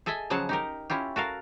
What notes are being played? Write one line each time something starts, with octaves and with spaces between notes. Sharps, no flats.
G#4 A4 D#5 E5 G#5
C#3 F3 F#3 G#4 F#5 A5
D#4 G4 A#4
C#4 E4 F4 G4
F#4 A4 A#4 F5